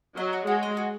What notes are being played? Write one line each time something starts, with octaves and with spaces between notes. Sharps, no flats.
F#3 D#5
F#4
G#3 F#4
D#5
F#4